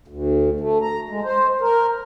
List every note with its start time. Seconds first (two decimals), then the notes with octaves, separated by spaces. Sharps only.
0.08 D2
0.60 A3
0.82 A#5
1.09 G#3
1.24 C5
1.61 A#4